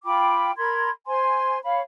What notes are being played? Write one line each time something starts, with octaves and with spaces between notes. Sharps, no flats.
F4 G5 B5 D6
A#4 B5 C6 G#6
C5 G#5 C6
C#5 F5 B5